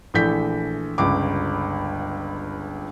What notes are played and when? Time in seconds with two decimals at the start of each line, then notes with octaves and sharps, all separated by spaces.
0.14 A#1 E3 A3 G6 B6
0.98 G1 C#2 D6